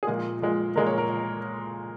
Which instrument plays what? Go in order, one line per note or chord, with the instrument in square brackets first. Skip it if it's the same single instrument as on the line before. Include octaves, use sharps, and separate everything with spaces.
[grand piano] G#4
A#2 F3 G#3 A#4
A#2 F3 G#3
A#2 F3 G#3 A#4
C#5
A#4